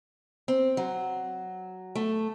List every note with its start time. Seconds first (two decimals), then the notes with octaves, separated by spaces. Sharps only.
0.48 C4
0.77 F#3
1.95 A3